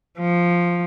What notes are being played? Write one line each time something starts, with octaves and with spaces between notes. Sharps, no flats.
F3